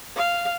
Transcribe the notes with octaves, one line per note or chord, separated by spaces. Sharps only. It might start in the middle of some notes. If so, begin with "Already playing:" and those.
F5